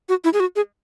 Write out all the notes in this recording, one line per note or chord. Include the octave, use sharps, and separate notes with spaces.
F#4
E4
G#4
F#4
G#4